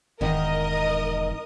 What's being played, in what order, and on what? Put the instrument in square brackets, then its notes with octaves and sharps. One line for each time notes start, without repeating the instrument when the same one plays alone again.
[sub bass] E1 [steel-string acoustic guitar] E2 G#2 D#3 [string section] A#4 D#5 D#6